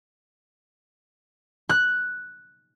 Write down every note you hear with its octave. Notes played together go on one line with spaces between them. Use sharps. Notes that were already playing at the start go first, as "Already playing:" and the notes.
F#6